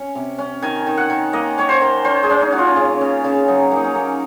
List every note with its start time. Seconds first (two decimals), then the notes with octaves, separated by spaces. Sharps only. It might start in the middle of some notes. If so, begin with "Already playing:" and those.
Already playing: C#4
0.15 C3
0.38 C#4
0.62 D#3 G#5
0.86 D#3
0.97 F#5
1.10 D#3
1.33 A#3 D#5
1.58 C#4 C#5
1.69 C5
1.81 D#3
2.05 C#4 C5
2.23 G#4
2.29 C#4
2.41 D#4
2.52 C#4 F#4
2.58 F4
2.76 C#3
3.01 C#3
3.24 C#3
3.48 F#3 D#4
3.72 A#3 D#4
3.84 C#4
3.95 A#3